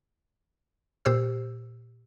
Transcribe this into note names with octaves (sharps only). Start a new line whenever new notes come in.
A#2 G4 C5 E6